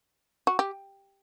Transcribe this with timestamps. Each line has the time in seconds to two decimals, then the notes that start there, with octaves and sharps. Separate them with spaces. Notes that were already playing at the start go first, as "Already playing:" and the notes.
0.47 F#4
0.59 G4